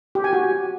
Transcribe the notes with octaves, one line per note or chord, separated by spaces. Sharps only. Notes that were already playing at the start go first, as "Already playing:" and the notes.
G4
G#5
F#4